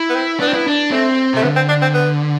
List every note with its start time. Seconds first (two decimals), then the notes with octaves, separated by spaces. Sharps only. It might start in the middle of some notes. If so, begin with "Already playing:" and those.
Already playing: E4
0.09 B3
0.15 C4
0.40 B3 D4
0.47 C4
0.53 B3 E4
0.67 D4
0.91 A3 C4
1.34 C3 A3
1.43 D3 B3
1.56 C4
1.69 D4
1.82 C4
1.94 B3